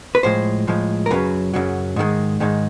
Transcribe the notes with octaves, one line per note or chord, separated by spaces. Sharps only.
B4
A2 F3 G#3 C5
A2 F3 G#3
A#4
F#2 C#3 F#3 B4
F#2 C#3 F#3
G#2 D#3 G#3
G#2 D#3 G#3